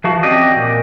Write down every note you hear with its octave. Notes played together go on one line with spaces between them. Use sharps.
E3 F3 F#4
C4 C#4 F#4 G4 D5 D#5
A#2